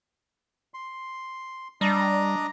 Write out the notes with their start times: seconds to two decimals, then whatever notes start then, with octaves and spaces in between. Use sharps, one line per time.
0.74 C6
1.81 G3 D4 D#5 A#5